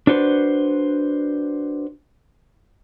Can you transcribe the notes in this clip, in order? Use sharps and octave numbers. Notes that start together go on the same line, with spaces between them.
D4 F#4 B4 C5